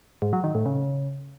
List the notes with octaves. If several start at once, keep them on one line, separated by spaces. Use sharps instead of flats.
G#2
F#3
D#3
A2
C#3